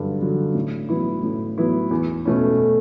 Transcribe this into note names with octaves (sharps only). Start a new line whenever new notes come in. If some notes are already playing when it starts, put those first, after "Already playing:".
Already playing: G2 D3 F#3
D3 F#3
A2
F#3 B3 E4
A2
F#3 B3 E4
E2
B2 A3 C#4